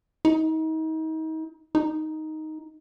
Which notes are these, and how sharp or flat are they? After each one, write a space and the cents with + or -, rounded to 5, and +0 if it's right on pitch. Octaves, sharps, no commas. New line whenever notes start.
D#4 +35
D#4 +5